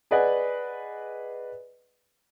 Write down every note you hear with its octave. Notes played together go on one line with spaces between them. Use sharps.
G#4 B4 D5 D#5 F#5 G#5